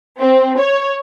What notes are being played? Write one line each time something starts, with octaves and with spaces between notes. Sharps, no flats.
C4
C#5